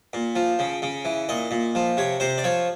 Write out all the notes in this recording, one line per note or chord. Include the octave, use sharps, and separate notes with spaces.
A#2
F3
C#3
C#3
E3
A#2 D#5
A#2
F3
C3 C#5
C3 C5
D5
F3 C#5